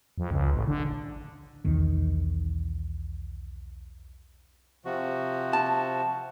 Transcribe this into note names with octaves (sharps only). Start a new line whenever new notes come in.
F2
C#2
A1
D3
B1 E2 D#3
C3 F3 F#4
A5